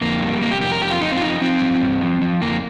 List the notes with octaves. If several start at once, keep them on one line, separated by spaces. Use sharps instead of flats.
F2 A#3
G3
C3 A#3
G4
F2 G4
A#4
F2 G4
F4
F2 D#4
C4
F4
F3 D#4
F3 C4
G2
G2
F3
F3
F2 A#3